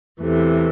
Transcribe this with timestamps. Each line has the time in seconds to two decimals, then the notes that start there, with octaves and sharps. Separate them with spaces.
0.20 E2 C3 E3 A3